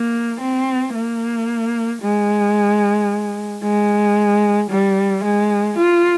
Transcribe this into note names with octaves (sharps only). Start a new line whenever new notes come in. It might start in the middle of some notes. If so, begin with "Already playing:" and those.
Already playing: A#3
C4
A#3
G#3
G#3
G3
G#3
F4